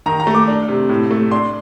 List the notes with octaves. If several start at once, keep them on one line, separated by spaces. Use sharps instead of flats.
D#3 A#5
A#5
A3
D6
D4
C3
A2
A3
D4 C6